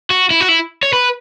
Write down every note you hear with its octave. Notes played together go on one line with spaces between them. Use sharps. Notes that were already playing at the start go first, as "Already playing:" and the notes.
F#4
E4
F#4
E4
C#5
B4